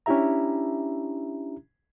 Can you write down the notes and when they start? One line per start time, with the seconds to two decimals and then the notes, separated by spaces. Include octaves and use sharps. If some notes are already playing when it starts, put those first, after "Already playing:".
0.06 C#4 D4 E4 G4 E5 A#5